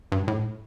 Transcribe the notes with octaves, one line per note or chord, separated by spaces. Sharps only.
G2
A2